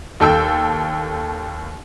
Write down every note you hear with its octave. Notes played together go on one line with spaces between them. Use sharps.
D#2 A4 G5 E6